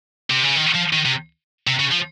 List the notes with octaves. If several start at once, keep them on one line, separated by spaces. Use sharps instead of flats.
C3
C#3
D#3
F3
D#3
C3
C3
C#3
F3